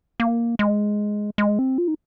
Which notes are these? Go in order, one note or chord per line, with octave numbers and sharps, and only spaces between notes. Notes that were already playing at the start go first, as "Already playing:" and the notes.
A#3
G#3
G#3
C4
F4
D#4